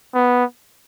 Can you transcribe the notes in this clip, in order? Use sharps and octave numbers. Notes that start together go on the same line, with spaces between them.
B3